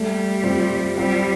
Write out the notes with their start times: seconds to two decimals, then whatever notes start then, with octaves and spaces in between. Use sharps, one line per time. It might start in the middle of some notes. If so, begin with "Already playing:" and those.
Already playing: G3 A3
0.44 C4 F4
0.97 G3 C4 F4